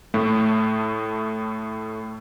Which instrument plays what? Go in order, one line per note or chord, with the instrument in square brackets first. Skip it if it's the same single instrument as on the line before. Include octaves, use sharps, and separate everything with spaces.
[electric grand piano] A2 A3